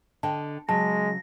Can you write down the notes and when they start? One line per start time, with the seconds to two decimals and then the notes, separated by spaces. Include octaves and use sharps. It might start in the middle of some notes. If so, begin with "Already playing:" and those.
0.23 D3 D#5 G5 A5
0.69 C#3 F#3 G#3 A5 A#6